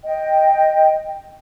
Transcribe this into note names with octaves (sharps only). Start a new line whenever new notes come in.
D#5 G5